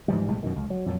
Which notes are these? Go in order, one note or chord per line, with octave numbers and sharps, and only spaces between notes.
G#2 E3 F3 G3
B1 A2 G3 G#3
F#2 B2 D#3
C#2
F#3
F2 A#2 F#3